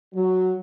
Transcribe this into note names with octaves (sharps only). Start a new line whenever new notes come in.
F#3